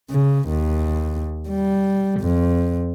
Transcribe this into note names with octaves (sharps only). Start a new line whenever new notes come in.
C#3
D#2
G3
F2